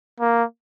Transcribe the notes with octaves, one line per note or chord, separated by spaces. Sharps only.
A#3